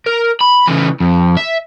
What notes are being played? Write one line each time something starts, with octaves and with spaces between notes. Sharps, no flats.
A#4
B5
C#3 E3
F2
E5